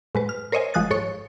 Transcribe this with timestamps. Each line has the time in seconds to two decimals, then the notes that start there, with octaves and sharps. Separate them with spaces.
0.15 A2 G#3 B4
0.29 F6
0.52 A#4 C5 C#5 D#5 E5 G#5
0.74 G1 F3 G#3 D#6 F#6 A6
0.90 G#2 A4 C#5 C#6